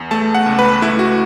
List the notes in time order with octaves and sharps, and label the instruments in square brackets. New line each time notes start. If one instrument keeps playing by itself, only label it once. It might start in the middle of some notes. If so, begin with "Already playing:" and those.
Already playing: [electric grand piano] E2
A3 A5
F#5
C#2
B4
A3 E4
F#4